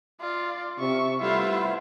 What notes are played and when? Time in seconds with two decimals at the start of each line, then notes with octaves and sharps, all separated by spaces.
0.21 F4 D5
0.79 C3 E5 C#6
1.21 G3 A3 B3 E4 F4 C5 E5